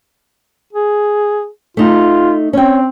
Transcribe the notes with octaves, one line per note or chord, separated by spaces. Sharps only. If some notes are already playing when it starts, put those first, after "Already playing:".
G#4
A3 D#4 F4
C4 C#4 G5